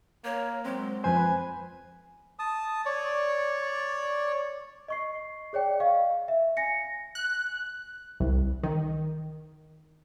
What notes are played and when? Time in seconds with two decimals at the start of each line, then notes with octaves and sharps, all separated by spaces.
0.25 A#3 C#5
0.65 F#3 G#3 C4
1.04 F2 B4 C5 G#5
2.39 A5 D#6
2.85 C#5 D5
4.88 D#5 C#6 C7
5.53 G#4 C#5 D5 G5
5.80 D#5 F5 C#6
6.28 E5
6.57 G#5 A#6 C#7
7.15 F#6
8.20 C2
8.63 D#3